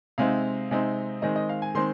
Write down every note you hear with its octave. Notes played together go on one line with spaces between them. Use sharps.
C3 G#3 C4 D#4 F5
C3 G#3 C4 D#4
D#3 G#3 C4 D#5
D#5
F5
G#5
D#3 G#3 C4 C6